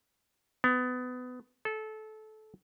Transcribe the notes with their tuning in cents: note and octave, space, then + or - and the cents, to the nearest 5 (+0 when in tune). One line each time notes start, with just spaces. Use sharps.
B3 +25
A4 -20